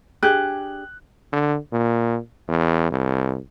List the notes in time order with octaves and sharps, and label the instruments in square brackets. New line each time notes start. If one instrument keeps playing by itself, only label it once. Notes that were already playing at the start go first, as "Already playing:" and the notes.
[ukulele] D4 G4 G#4 [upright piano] F#6
[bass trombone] D3
A#2
E2
C2